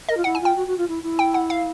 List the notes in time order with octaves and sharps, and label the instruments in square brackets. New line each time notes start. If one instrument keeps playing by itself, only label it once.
[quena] A#4 [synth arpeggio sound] D#5
[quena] F4
[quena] E4 [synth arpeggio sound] F#5
[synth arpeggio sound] G#5
[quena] F4 [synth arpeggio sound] G5
[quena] F#4
F#4
F4
E4
E4
[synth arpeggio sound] G5
F#5
F5